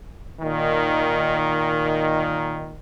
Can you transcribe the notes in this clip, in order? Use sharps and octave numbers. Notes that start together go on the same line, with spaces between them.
A#2 D#3